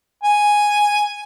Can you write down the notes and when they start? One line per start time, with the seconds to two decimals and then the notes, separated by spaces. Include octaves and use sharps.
0.23 G#5